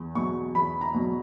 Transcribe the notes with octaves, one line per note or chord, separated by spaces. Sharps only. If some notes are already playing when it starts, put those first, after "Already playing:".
Already playing: E2
B2 F#3 C#6
E2 B5
A#5
B2 F#3